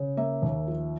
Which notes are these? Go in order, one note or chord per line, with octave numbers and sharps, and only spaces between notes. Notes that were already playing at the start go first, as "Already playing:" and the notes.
Already playing: C#3
A#3 E5
D#2
F3